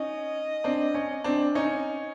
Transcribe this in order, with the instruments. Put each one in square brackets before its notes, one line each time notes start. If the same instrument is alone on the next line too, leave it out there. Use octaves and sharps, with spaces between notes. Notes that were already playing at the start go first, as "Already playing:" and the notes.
Already playing: [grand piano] C#4 D#4 [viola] D#5
[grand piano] C4 D4
C#4
C4 D4
C#4 D#4